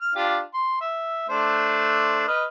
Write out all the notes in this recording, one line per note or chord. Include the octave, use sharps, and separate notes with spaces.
F6
D4 F4 G4
C6
E5
A3 D4 C5
B4 D#5 F6